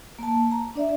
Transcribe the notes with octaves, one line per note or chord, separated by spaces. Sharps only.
A#3 A5
A#5
D4 D5 E5